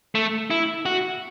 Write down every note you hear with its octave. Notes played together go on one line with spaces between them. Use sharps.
A3
E4
F#4